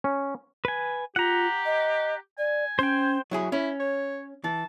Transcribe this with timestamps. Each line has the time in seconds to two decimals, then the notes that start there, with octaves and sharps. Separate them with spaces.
0.04 C#4
0.65 B4 G#5
1.16 F4 G4 F#5 A#5
1.66 D#5
2.38 D5 G#5
2.79 C#4 C5 G5
3.31 F#3 E4 G#4
3.52 C#4 E4
3.80 C#5
4.44 E3 A5